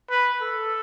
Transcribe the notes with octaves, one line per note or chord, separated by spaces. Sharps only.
B4
A4